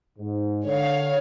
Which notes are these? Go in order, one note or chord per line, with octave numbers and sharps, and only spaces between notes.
G#2
D3 C#5 F5